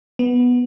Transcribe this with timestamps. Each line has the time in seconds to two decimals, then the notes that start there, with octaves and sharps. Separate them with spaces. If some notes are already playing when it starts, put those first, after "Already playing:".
0.19 B3